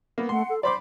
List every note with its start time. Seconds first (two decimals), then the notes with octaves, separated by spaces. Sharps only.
0.18 A#3 B3
0.29 A3 F#5 C6
0.49 A4
0.63 C5 D5 B5 C6 D6